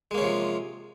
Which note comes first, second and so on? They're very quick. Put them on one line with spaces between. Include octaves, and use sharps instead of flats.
G#3 A#3 C#4 C3 F3